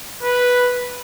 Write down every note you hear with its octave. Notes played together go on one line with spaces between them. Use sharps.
B4